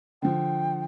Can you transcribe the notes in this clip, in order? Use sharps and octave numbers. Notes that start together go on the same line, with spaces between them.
D3 F3 G5